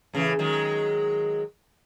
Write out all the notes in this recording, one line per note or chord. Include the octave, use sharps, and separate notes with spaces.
A2 C#3 E3
D#3 F#3 G#3